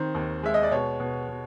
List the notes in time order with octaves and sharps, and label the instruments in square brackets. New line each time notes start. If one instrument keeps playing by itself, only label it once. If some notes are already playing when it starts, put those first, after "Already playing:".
Already playing: [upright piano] D#3 C4 C5
D#2
G#3 E5
D#5
D5
B2 C#5
B2
B2